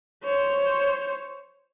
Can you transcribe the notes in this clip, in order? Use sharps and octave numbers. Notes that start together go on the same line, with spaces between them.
C5 C#5